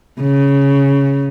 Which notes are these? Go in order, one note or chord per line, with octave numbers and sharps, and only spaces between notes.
C#3